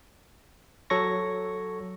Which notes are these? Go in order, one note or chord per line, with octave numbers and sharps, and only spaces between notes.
F#3 A4 C#5 C#6 A#6